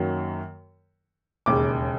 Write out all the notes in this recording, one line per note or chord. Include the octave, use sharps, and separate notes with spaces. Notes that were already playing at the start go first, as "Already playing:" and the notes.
Already playing: F#2 D#3 F#3 A#3
E1 D#2 C#3 D6